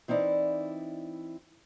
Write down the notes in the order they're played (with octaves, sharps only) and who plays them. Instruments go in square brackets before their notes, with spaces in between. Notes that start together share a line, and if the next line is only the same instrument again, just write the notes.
[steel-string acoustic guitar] E3 C4 D#4 E4 D5